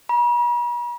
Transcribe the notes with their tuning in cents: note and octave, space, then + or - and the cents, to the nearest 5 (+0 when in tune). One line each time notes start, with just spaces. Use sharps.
B5 -45